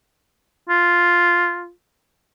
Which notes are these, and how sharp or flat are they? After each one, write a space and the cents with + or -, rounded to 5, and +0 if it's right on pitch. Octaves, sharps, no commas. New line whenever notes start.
F4 +0